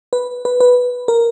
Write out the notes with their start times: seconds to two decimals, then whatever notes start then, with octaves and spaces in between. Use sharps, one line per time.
0.13 B4
0.45 B4
0.60 B4
1.08 A#4